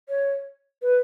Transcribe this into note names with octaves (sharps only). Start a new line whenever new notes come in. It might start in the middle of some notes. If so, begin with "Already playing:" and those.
C#5
B4